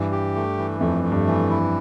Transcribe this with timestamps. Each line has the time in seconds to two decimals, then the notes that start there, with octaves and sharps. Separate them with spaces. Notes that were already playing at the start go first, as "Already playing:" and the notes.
Already playing: G2 E3
0.12 G4
0.35 A3
0.58 E3
0.80 F2 A3
1.03 A3
1.12 G2
1.26 E3
1.50 E4